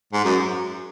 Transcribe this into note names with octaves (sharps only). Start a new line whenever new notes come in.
G#2
F#2